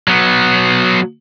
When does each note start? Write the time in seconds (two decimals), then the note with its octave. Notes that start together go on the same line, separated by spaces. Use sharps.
0.08 F#3 B3